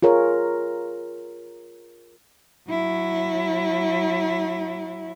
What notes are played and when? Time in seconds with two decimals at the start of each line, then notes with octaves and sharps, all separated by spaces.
0.02 F4 G#4 A#4 C#5
2.70 F#3 E4